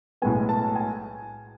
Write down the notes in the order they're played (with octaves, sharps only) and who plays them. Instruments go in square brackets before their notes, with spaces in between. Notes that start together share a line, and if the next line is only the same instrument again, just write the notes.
[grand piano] B1 A2 G#3 B3 G#5
A5
G#5